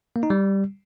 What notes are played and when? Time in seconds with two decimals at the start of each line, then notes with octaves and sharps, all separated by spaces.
0.16 A#3
0.23 D#4
0.30 G3